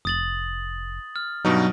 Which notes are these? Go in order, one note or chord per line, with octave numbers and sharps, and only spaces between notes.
F1 D#6 A6 F#7
F6
G2 B2 F#3 D#4